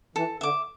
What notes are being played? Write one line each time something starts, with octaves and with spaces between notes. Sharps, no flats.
E3 A4
D3 E5 D6